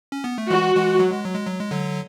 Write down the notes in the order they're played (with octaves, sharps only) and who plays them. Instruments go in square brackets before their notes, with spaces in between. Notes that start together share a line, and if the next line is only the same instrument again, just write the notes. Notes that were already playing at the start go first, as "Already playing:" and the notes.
[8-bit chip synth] C#4
B3
A3
[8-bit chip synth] E3 G#3 [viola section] F#4
[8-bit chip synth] E3 G#3
F#3
G#3
F#3
G#3
F#3
G#3
D3 F#3